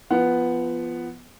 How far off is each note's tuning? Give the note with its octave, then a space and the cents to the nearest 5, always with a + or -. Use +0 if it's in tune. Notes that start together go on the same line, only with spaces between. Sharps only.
F3 -20 B3 +0 F#5 +5